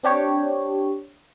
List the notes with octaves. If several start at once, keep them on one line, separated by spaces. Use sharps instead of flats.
C4 D4 G4 C#5